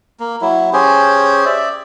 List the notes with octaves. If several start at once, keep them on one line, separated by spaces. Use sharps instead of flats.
A#3
F#3 E4
C#4 G4 G#4 C5
D5 E5